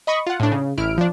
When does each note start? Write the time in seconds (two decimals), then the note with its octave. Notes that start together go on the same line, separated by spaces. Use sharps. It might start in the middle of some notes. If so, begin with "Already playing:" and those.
0.07 D#5 B5 C#6 D#6
0.27 F4 F#5
0.40 A2 D4
0.51 C#3
0.78 A1 E4 F6 D7
0.98 F3 D4